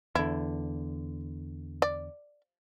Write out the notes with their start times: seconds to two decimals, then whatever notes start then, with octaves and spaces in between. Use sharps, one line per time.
0.15 E2 D3 E4
1.82 D5